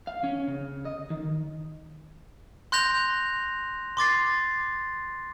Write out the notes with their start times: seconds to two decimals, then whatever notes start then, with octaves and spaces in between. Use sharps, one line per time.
0.07 F5
0.24 C#4
0.48 C#3
0.85 D#5
1.10 D#3
2.72 C6 F#6 G6 A#6 F7
3.97 C6 D6 A6 C7